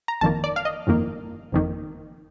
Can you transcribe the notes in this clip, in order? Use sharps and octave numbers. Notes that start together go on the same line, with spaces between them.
A#5
G1 F2 D#3 A#3 A5
D5
F5
D#5
G1 F2 D#3 A#3
G1 F2 D#3 A#3